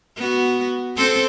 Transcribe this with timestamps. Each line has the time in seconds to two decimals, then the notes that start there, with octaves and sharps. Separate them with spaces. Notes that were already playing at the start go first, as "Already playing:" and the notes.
0.17 B3 F#4
0.97 C4 A4 C5